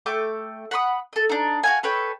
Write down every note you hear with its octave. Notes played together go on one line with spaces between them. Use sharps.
A3 G5 D6
F#5 B5 C6 D#6
A4 D#5
D4 D#4
F#4 F5 G#5
A4 B4 C#5 G5